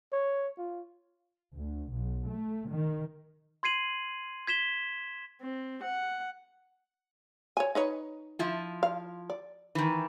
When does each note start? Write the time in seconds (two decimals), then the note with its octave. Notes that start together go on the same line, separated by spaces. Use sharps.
0.12 C#5
0.58 F4
1.53 D2
1.90 B1
2.27 A3
2.67 D#3
3.63 C6 G#6 C7 D#7 F#7
4.47 G#6 B6 E7 G7
5.42 C4
5.83 F#5
7.57 C#5 G#5
7.75 D#4 B4 C#5
8.39 F3 E4 F4
8.83 F5
9.30 D5
9.75 D#3 E3